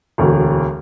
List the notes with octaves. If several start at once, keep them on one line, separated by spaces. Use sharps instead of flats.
E1 D2